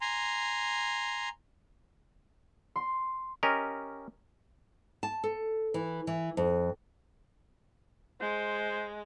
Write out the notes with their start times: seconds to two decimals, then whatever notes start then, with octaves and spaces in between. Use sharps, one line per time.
0.01 G#5 A#5 C6
2.76 C6
3.43 C#4 G4 A#4 D#5
5.03 A5
5.24 A4
5.74 E3
6.07 E3
6.37 F2
8.21 G#3 C5